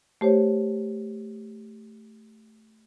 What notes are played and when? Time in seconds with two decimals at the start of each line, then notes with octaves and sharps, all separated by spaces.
0.21 A3 G4 C5 C#5